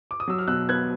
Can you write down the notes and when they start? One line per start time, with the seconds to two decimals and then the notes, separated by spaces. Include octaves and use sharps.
0.11 D6
0.20 D#6
0.28 F#3 E6
0.39 F6
0.48 B2 E6 F#6
0.69 B3 F#6 G#6